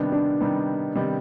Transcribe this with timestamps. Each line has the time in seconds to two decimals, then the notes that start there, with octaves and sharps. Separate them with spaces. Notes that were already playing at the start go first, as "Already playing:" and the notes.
Already playing: C3 D#3 G3 B3 D4
0.12 D4
0.40 C3 D#3 G3 B3 D#4
0.95 C3 D#3 G3 B3